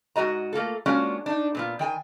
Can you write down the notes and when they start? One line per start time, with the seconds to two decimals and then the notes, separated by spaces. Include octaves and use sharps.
0.16 G#2 C#3 F#4 D#5 A#5
0.53 A3 A#3 F4 A4
0.86 G#3 A#3 C#4 D4 F4 F#4
1.26 D4 D#4
1.55 A#2 B3 F4
1.79 D#3 G5 G#5